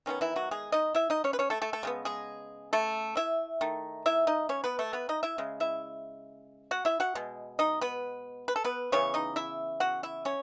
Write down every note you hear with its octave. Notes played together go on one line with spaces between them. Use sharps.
D#3 G#3 B3 C#4
E3 E4
F#3 F#4
G#3 G#4
D#4 D#5
E4 E5
D#4 D#5
C#4 C#5
B4
C#4 C#5
A3 A4
A3 A4
A3 A4
C#3 G#3 B3
G#3 G#4
A3 A4
E4 E5
D#3 A3
E4 E5
D#4 D#5
C#4 C#5
B3 B4
A3 A4
B3 B4
D#4 D#5
E4 E5
C#3 G#3
E4 E5
F#4 F#5
E4 E5
F#4 F#5
B2 G#3
D#4 D#5
B3 B4
B4
A4
B3 B4
C#3 E3 B3 C#4 C#5
D#4 D#5
E4 E5
F#4 F#5
E4 E5
C#4 C#5